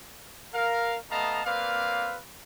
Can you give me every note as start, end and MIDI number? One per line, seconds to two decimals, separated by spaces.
0.53 0.97 70
0.53 0.97 77
1.10 1.41 57
1.10 1.41 59
1.10 1.41 75
1.10 1.41 77
1.10 1.41 81
1.10 1.41 82
1.45 2.19 58
1.45 2.19 60
1.45 2.19 71
1.45 2.19 74
1.45 2.19 77